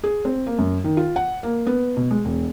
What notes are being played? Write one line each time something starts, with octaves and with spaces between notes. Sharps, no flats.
G#4
C4
A#3
F#2
D#3
F4
F#5
A#3
B3
B2
G#3
E1